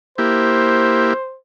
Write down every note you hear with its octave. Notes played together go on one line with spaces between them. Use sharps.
A#3 E4 G4 C5